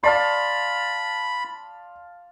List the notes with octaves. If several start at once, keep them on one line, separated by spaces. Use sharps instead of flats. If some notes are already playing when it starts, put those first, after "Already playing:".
D5 F5 A5 B5 C6